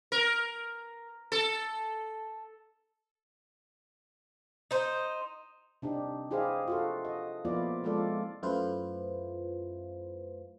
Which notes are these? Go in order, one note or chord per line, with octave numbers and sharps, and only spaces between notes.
A#4
A4
D#4 C5
C3 D4 D#4 G4
E4 G4 G#4 C5 D#5 F5
F4 F#4 A4
D#5
F3 A#3 B3 E4 F4 D5
F3 G#3 C4 F4 A4 D5
F#2 A3 E4 F4 B4 C5